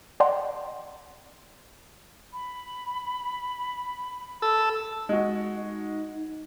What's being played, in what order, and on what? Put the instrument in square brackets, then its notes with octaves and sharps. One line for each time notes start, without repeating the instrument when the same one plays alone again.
[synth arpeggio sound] D5 D#5 F#5 G5 A#5 C6
[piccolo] B5
[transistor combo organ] A4 E6
[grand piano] G#3 F#4 [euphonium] D#4